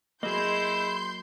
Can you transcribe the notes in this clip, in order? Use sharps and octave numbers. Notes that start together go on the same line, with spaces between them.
F#3 A#3 E4 G#4 D#5 C6 G6